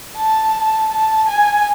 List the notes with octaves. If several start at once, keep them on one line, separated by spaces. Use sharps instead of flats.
A5
A5
G#5